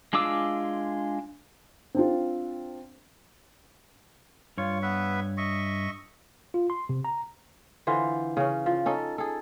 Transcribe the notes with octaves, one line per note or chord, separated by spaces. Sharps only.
G#3 D4 F4 D6 E6
C4 D4 F4
G2 F4 C#5
B3 B4 E5
D#5 E5 C#6
F4
C6
C3
A#5
D3 E3 F4 C5
C#3 C#4
F3
C#4 D#4 A4
G#4 A4